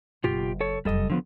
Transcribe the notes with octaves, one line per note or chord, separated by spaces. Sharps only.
F#1 B2 F4 G4
A4 C#5
F1 F#2 G3 A4 D#5
D3 D#3 F3 B3